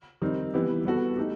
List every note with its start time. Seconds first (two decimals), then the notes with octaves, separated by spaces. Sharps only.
0.22 D#3 G3 C4 D#4
0.54 E3 B3 E4 G4
0.85 G3 B3 F#4 A4
1.17 A3 D#4 G4